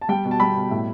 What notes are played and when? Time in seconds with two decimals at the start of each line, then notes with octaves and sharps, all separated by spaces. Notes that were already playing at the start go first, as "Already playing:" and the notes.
0.01 A5
0.09 G3 G5
0.25 B2
0.31 A5
0.40 G3 B5
0.56 B2
0.71 A2